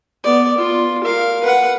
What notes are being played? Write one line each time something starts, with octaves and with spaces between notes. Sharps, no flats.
B3 D5
F4
A#4 F5
B4 F#5